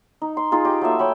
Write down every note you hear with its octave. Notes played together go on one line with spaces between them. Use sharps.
D#4
C6
D#4 F4 G#4
G4 D#5
F#3 A3 A#3 E5
C#5 G5 B5